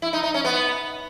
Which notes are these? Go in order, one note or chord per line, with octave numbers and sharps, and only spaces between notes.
E4
D#4
D#4
C#4
B3